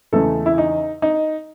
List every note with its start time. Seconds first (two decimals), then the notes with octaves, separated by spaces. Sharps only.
0.13 E2 C#3 G#3 A3 A4
0.46 E4
0.58 D#4
1.02 D#4